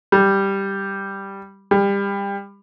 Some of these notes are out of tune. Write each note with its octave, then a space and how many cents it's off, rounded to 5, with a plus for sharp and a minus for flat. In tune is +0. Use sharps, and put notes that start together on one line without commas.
G3 +0
G3 +25